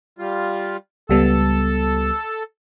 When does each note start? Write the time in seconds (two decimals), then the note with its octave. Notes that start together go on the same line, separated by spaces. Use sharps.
0.19 G3 F4
1.09 C#2 G3 B3 A4 E6